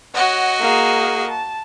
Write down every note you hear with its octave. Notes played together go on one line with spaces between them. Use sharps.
F#4 C#5 D#5 F#5
A#3 G#4
A5